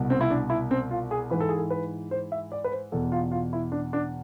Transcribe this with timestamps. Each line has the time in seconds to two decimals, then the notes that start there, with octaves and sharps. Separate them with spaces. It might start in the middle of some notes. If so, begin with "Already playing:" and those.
Already playing: C2 B2
0.10 C4
0.21 E4
0.30 D4
0.50 E4
0.71 C4
0.91 F4
1.11 G#4
1.30 G#2 E3 B4
1.40 A4
1.49 G#4
1.58 A4
1.70 B4
2.11 C5
2.32 E5
2.52 D5
2.64 B4
2.72 C5
2.92 E2 B2 A4
3.12 F4
3.31 F4
3.53 E4
3.72 D4
3.93 D4